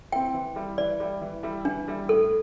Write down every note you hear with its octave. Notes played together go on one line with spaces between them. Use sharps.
C4 E4 G5
E3
G3 E4
E3 D5
G3 E4
E3
G3 E4
E3 D4
G3 E4
A2 A4